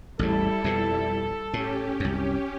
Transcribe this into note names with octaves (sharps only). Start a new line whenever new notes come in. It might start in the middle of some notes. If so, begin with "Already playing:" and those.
A1 E2 G#2 G3 E4 A4
F2 B2
A2 C#4 G4
C2 F#2